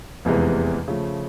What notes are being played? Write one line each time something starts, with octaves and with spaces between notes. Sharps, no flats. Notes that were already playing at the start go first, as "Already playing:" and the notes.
F1 E2 C3 E3 G#3
C#3 F3 A3